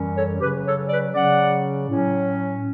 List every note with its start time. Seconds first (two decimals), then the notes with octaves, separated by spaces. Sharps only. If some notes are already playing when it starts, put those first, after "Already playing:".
Already playing: F#2 E3 G3 C#4
0.15 A4 C#5
0.40 C#3 F#3 C#4 G4 B4
0.65 A4 C#5
0.89 B4 D5
1.14 C#3 F#3 C#4 D5 F#5
1.87 A2 F#3 C#4